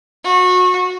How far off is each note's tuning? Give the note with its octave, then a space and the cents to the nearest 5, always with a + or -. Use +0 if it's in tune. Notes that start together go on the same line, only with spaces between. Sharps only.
F#4 -25